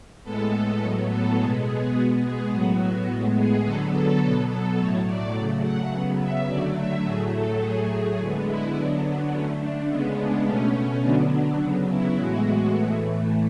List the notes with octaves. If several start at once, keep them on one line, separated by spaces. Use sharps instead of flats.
A2 G#3 B3 A4
A2 F#3 B3
A4
B2 G#3 B3 G#4
G#4
B2 G#3 B3 F#4
G#4
A2 F#3 B3 F#4
A2 G#3 B3
G#4
D3 F#3 B3 A4
A4
B2 F#3 B3 A4
A4
A2 F#3 A3 C#5
D5
C#3 F#3 A3
F#5
C#3 F#3 B3
E5
D3 F#3 A3 D5
E5
A2 F#3 A3 G#4
A4
A2 F#3 A3 G#4
D3 G#3 B3
E4
D3 F#3 B3 D4
D3 A3 C#4
D4
C#3 G#3 B3
D4
B2 A3 C#4
D3 F#3 B3 D4
C#3 F#3 B3
E4
A2 E3 G#3 B3 F#4
A2 E3 A3